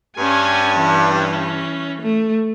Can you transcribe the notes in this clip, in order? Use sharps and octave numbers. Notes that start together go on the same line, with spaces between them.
G2 C#4 G#5
E3 C#4
A3